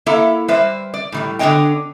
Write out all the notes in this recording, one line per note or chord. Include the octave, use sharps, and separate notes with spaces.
A#3 E4 A4 E5 A#5
G3 B4 C5 D5 E5
D5
A2 D#3 G3
D3 B3 D4 C#5 D#5 G5